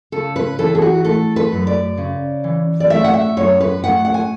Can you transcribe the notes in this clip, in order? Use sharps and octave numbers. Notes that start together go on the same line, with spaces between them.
C#3 A4
B4
E3 A4
G#4
F#4
A3 A4
B4
F#2
D5
C#3
E3
D5
A3 E5
F#5
E5
F#2 C#5
B4
A3 F#5
F#5
G#5